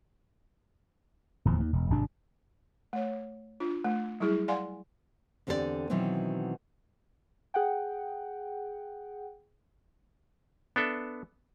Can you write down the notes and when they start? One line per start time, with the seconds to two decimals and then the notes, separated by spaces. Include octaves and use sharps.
1.45 D1 E2 F3
1.60 D#2
1.73 E1
1.90 G#1 C3 D4
2.93 A3 C#5
3.60 D4 F4
3.84 A3
4.20 F#3 G3 E4 G#4
4.48 D5 F5 F#5 G#5 C6
5.47 E2 D3 C4 G4 G#4 D5
5.90 B2 D#3 E3 F#3 B3 C4
7.54 G#4 F#5 G5
10.76 B3 D4 A4 E5